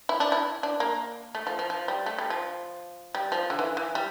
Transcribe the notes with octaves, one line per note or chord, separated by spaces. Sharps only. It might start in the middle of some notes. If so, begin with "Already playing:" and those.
E4
D4
E4
D4
A#3
A3
F3
F3
F3
G3
A3
G3
F3
G3
F3
D3
E3
E3
G3